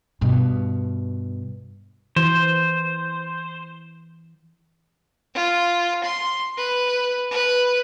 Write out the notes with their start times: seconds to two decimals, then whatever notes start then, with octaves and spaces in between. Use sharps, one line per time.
0.21 G2 B2
2.16 E3 C5
5.34 F4
6.03 C6
6.57 B4
7.31 B4